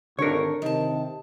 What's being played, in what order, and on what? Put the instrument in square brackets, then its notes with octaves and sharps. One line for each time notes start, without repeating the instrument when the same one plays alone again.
[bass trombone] G#1 [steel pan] D3 D4 [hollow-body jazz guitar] A#4 C#5
[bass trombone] C3 [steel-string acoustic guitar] D#3 A5